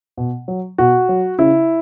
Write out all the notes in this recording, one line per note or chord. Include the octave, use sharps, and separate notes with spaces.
B2
F#3
B2 F#4
F#3
C#3 E4